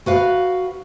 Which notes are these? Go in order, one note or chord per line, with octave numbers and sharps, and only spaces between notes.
F#4 B4 F5